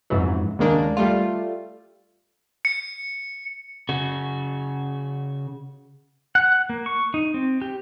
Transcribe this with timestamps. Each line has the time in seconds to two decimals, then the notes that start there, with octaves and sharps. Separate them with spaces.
0.10 F2 G#2 C#3 E3 F#3
0.59 D#2 C#3 G#3 A#3 D4
0.97 G3 A3 F4
2.65 C#7
3.89 C#3 F#4
6.35 F#5
6.70 A#3
6.86 C#6
7.14 D#4
7.34 C4
7.62 G4